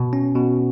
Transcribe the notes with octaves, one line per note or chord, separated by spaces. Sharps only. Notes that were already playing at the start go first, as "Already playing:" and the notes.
Already playing: B2
C#4
B2